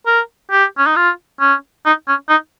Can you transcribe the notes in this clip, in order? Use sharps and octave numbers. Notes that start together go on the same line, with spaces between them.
A#4
G4
C#4
D#4
F4
C#4
D#4
C#4
D#4